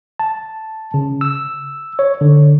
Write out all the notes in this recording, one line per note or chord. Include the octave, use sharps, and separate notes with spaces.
A5
C#3
E6
C#5
D3